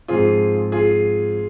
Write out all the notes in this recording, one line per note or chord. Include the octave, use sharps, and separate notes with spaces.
G#2 F3 C4 F4 G#4
F4 G#4